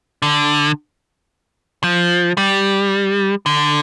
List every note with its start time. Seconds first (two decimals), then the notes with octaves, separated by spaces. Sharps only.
0.22 D3
1.83 F3
2.37 G3
3.46 D3